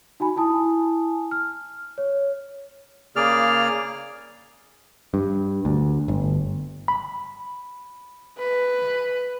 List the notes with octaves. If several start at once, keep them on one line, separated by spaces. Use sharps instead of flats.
D#4 F#4 G#5 B5
E4 G#5 A5 D#6
F6
C#5
C#3 A#3 G#4 D5 F6
G2
D2
G1
B5
B4